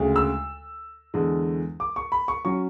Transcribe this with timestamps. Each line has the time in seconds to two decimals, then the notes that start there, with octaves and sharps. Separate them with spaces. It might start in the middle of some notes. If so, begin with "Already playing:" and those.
Already playing: D2 C#3 G#3
0.16 E6
1.14 E2 D3 G#3
1.80 D6
1.96 C#6
2.12 B5
2.28 C#6
2.45 F#3 C#4 C#6